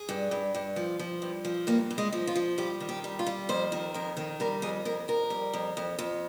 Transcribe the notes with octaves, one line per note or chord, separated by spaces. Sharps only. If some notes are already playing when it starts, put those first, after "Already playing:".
Already playing: G#4
G2
G2
G2
F3
F3
G2
F3
G2 A#3
G2
G#3
F3
F4
F3
G3 G4
D#3
G4
G3
F4
G3
F2 C5
D#3
F2 A#4
D#3
G3 A#4
F2 G#4
F2 A#4
F2 A#4
G3
F2
F2
F2